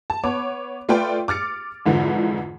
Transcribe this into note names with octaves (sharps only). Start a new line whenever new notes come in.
A5
B3 C#5 D6
A3 F4 B4 D5 G5 C6
D6 F6 A6 C#7
F2 G#2 D3 E3 F3